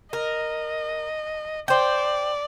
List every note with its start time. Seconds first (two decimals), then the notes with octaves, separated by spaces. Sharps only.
0.13 A#4 D#5
1.68 C5 D5 G5